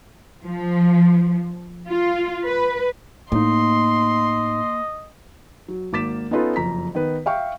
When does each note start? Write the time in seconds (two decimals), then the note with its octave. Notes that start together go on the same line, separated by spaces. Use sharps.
0.44 F3
1.88 F4
2.45 B4
3.32 A2 A#3 D#4 D#5 C6
5.68 F#3
5.93 G#1 A#3 D6 A6 B6 E7
6.31 B3 C#4 D#4 F4 A4 B4
6.56 F#1 F2 A#5 B6
6.95 D#3 B3 B4
7.26 E5 F5 G5 C#6